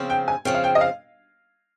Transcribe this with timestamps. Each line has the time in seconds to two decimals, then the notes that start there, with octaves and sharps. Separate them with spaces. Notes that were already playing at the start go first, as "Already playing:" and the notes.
Already playing: C#3 F3 C4
0.10 G5
0.28 G#5
0.45 C#3 F3 C4 G5
0.54 F5
0.64 G5
0.75 D#5
0.81 F5